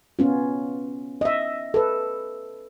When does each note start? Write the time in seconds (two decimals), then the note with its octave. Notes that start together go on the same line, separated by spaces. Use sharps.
0.19 B3 C#4 F4
1.21 D#5 E5
1.74 A4 B4